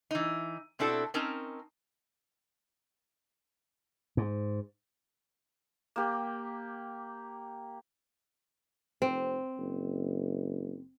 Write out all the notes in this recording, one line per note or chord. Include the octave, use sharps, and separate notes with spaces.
E3 D#4
B2 C4 D4 E4 F#4 A4
C4 C#4 D#4 A#4 A5
G#2
A#3 G4
F1 C4
F#1